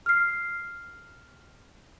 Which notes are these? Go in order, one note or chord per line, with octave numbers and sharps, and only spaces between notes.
F6 C7